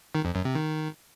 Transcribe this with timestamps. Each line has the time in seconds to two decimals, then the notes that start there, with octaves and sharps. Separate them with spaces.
0.15 D#3
0.25 F2
0.35 F#2
0.45 C3
0.55 D#3